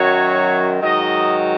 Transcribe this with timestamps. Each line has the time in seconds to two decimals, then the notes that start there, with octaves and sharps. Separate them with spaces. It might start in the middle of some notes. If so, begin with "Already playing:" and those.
Already playing: F#2 D#3 F#3 C#5
0.82 G#2 D#3 F#3 D#5